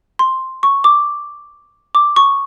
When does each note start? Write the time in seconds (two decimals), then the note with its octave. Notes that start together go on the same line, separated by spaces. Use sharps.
0.19 C6
0.63 C#6
0.84 D6
1.95 D6
2.16 C#6